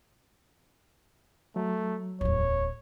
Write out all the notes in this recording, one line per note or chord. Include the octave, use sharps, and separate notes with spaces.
F#3 A3
D1 E2 C#5